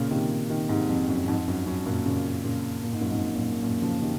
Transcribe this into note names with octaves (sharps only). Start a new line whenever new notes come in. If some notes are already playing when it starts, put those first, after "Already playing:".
Already playing: A#2 C#3
C3 D#3
C3 D#3
G#2 C3
F2
F#2
F2 G#2
F#2
F#2
F#2 A#2
A#2 C#3
A#2 C#3
A#2
G#2
F#2 A#2
F2 G#2
F#2 A#2
F#2 A#2
C#3 F3
C3 D#3